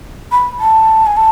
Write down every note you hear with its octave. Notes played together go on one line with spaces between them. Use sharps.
B5
A5
G#5
A5